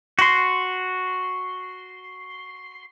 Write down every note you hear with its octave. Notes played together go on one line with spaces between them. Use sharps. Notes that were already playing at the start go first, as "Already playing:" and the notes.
F#4 C6